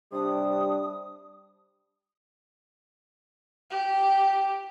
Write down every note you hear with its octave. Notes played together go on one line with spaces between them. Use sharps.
C3 G3 D4 D#6
G4